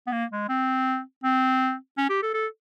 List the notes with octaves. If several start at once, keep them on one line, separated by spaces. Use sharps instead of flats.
B3
A#3
G#3
C4
C4
C#4
G4
A4
A4